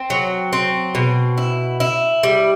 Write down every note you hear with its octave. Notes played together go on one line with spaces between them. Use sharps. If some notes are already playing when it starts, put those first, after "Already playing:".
Already playing: C4
F#3
C4
B2
E4
E4
G3